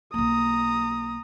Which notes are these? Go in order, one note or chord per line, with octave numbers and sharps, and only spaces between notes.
B1 A#3 A#5 D#6